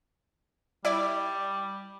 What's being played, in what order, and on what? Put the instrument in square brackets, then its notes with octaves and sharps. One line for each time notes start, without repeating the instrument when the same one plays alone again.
[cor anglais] G3 [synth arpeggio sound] E4 D5